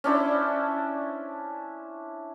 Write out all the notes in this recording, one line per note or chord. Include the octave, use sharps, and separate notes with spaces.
C#4 D4 E4 C5